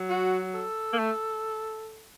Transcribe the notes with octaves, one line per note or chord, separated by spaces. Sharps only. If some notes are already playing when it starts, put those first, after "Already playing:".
Already playing: F#3
F#4
A4
A#3
A3